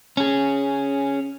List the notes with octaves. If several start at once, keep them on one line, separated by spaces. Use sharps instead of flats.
C#4 G#4